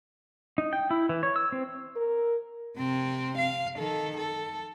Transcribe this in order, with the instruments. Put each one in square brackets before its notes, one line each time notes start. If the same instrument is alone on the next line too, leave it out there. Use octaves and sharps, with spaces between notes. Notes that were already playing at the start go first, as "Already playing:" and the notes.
[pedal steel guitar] D#4
G5
E4
E3
C#5
E6
C4
[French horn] A#4
[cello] C3 C4
F5
D#3 A4
A4